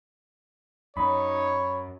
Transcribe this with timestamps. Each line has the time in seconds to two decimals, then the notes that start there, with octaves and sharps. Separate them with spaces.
0.97 F#2 D#4 C#5 B5